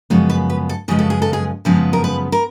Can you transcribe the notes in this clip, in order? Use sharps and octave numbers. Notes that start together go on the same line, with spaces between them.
F#2 C#3 F3 G#3 B3 C#5
B4
B4
A4
F#2 C#3 F3 G#3 B3 G#4
A4
G#4
A4
G#4
F#2 C#3 F3 G#3 B3 A#4
A#4
B4
A#4